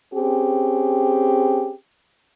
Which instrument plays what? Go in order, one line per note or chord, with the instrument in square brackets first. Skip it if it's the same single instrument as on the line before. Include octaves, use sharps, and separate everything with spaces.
[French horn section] C4 C#4 G4 G#4